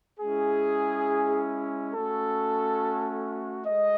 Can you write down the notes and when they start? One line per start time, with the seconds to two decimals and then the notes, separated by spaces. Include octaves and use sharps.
0.20 G#3 C#4 E4 G#4
1.93 A3 C#4 F#4 A4
3.67 G#3 D#5